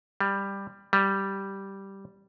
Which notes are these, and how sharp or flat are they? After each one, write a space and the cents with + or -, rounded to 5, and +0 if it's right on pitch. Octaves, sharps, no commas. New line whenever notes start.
G3 +10
G3 -5